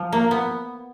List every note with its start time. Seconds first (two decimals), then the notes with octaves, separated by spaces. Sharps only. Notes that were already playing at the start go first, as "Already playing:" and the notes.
Already playing: F3
0.12 A#3
0.31 B3